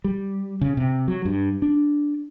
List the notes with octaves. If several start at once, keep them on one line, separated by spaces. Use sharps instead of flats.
G3
C#3
C3
F#3
G2
D4